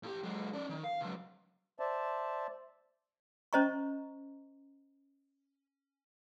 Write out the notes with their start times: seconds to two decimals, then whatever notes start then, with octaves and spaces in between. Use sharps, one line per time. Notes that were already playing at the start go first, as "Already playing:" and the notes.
0.03 A2 G4
0.23 F#3 G#3
0.54 C#4 D5
0.69 D#3
0.84 F5
1.01 C#2 F#3
1.79 C5 D5 E5 A5
3.53 C#4 C5 D#5 A#5 C#6